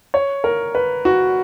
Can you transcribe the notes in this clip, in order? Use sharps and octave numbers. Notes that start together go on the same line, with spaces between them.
C#5
A#4
B4
F#4